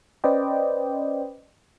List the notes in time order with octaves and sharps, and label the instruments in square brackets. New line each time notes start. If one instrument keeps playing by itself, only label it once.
[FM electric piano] C#4 B4 C5 D5 D#5 G5